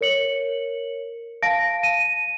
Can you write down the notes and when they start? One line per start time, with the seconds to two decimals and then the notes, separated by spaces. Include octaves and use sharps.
0.01 A#4 C#5 C#7 F#7
1.43 F5 A5 A#6 D7
1.82 A5 D#7